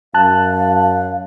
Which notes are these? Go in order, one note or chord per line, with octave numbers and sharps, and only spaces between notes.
F#2 F5 A5 F#6